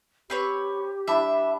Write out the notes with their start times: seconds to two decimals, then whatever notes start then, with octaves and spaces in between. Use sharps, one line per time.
0.30 C4 G4 B4 C#5
1.07 G3 D4 E4 E5